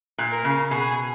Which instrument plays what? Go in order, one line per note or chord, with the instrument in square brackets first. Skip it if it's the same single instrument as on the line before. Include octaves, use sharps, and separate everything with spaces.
[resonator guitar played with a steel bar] A#2
[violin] A#4
[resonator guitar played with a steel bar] C#3
[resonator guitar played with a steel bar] B2 [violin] G#4